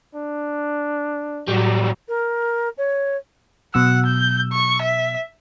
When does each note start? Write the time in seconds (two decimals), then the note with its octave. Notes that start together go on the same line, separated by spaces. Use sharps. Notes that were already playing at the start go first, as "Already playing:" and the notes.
0.15 D4
1.48 A2 F#3 G3
2.08 A#4
2.77 C#5
3.74 B2 F#3 F#5 E6
4.06 G6
4.52 C#6
4.81 E5